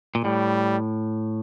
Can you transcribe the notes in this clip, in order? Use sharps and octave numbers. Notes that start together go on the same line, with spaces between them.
A#2
A2 G3